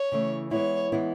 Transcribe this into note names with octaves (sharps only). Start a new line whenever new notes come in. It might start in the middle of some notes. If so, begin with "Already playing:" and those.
Already playing: C#5
C#3 E3 A3
E3 G#3 B3 E4 C#5
E3 G#3 B3 E4